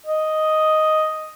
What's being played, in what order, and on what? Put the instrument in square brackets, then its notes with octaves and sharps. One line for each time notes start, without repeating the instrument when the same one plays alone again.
[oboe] D#5